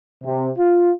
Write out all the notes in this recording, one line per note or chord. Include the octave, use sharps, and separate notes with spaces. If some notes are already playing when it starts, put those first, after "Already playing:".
C3
F4